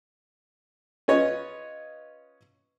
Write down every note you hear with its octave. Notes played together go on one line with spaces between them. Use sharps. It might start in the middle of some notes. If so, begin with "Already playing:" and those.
C#4 F4 B4 C#5 D#5